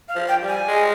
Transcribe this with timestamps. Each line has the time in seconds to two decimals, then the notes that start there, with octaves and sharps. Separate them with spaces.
0.08 F5
0.15 F3
0.28 G5
0.42 G3
0.48 G#5
0.68 G#3